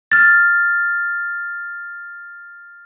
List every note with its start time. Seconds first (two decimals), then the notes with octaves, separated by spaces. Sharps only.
0.12 F6 A6